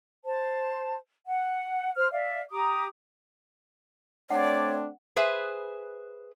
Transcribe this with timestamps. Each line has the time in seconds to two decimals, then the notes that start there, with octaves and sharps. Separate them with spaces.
0.25 C5 A5
1.27 F#5
1.96 C5 F6
2.12 D5 E5 F5
2.51 G4 A#5 D6 D#6
4.30 A3 C4 D4 C#5 D5 F#5
5.16 G#4 B4 C5 E5 G#5